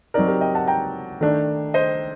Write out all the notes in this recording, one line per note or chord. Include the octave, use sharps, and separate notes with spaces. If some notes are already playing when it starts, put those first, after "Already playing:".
F#3 C4 D#4 A#4 D5
G4 A#4
D#5 G5
F#5 A5
G5 A#5
D#3 A3 D4
C5 D#5